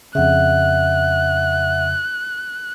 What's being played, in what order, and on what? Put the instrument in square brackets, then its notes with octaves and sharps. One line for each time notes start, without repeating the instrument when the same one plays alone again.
[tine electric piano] F2 C#3 [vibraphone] E5 F#5 [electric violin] F#6